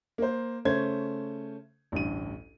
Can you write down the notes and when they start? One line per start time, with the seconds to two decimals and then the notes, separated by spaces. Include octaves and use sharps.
0.18 A#3 C5
0.65 C#3 A3 C#4 C5 G#6
1.92 A1 D2 G2 D#7